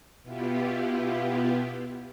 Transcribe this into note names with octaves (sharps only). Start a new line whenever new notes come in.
B2 B3 E4 F4 G4